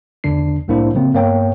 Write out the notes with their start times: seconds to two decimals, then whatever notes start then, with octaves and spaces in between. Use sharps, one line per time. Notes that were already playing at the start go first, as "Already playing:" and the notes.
0.24 E2 D3 D4 C7
0.68 C2 A2 A#3 D4 E4 C5
0.94 C#3 F#3 A#3 C4
1.14 G2 A#3 B3 C#5 G5